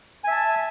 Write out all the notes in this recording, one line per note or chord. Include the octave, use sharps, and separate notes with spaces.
E5 G#5 A5